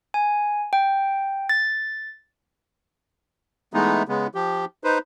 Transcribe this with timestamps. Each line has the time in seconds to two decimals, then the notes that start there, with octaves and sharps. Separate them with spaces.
0.14 G#5
0.73 G5
1.49 A6
3.74 E3 G#3 A3 B3 D#4
4.08 C#3 G#3 B3
4.35 F3 G4
4.84 D#4 B4 C5